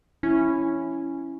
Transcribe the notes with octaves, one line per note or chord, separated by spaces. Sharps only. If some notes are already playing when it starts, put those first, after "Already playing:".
C#4 E4